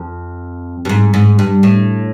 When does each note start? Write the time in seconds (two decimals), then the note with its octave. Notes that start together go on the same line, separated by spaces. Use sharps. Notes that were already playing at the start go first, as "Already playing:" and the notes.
Already playing: F2
0.85 G2
0.89 G#2
1.14 G#2
1.39 G2
1.63 A2